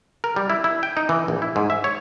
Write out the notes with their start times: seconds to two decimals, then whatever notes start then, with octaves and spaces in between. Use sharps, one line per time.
0.24 A#4
0.36 G3
0.50 E4
0.64 E4
0.83 G5
0.97 D#4
1.09 E3
1.28 A#1
1.42 E4
1.56 G#2
1.70 E5
1.84 C#5